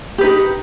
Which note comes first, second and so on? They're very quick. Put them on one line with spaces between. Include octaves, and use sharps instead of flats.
G4 B4 D#4